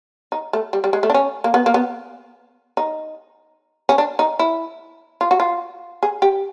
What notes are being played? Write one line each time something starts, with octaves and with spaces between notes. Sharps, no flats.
D#4
A3
G3
G3
G#3
A3
D4
C#4
A#3
B3
A#3
B3
D#4
C#4
D4
D#4
E4
F4
F#4
F4
G#4
G4